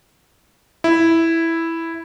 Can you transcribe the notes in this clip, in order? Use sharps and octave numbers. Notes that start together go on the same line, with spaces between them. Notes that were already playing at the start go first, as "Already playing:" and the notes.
E4